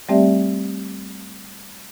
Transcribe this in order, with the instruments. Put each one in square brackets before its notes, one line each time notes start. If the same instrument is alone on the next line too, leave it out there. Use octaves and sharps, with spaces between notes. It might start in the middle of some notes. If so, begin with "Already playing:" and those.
[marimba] G3 A3 C4 G4 D5 E5